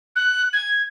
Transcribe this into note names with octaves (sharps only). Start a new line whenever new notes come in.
F#6
G#6